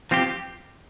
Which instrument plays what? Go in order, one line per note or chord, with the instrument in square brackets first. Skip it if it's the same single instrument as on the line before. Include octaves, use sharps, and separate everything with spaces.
[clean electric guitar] F3 C4 G4